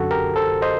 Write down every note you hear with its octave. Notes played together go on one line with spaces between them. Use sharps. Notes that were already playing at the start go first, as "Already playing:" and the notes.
Already playing: F#2 D3 F#4 A4
G4 A#4
A4 C5
C5 D#5